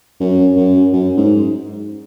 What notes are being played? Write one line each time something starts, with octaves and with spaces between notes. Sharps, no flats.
F#2
F#2
F#2
G#2